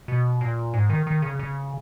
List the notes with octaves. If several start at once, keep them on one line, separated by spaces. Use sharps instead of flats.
B2
A#2
G#2
D#3
D#3
C#3
C#3